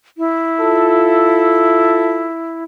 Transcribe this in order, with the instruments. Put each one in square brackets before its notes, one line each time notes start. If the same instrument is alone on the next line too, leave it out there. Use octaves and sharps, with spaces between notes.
[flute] E4
[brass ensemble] F4 A4